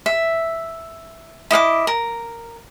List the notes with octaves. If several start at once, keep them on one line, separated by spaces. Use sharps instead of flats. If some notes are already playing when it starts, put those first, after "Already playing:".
E5
E4 D#5 F5 D6
A#4